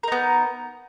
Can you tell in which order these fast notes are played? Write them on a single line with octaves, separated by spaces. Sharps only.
A#4 D#4 B3